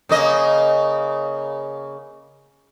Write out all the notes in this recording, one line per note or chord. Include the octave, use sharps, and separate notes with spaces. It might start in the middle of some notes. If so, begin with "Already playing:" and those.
C#3 A#3 D#5